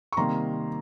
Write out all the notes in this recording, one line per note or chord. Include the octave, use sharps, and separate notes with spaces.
C#6
C3 D#3 G3 A#3 A#5 C6